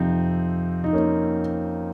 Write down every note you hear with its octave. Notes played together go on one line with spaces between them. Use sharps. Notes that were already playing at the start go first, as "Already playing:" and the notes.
Already playing: F2 C3 F3 C4 D#4
D#4
A#3 C#4